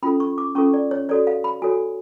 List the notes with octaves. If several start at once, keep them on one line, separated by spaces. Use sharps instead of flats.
C#4 F4 A4 B5
C#6
D6
C#4 F4 A4 C#6
D5
C#5
F#4 A4 C#5 D5
F5
B5
F#4 A4 C#5 G#5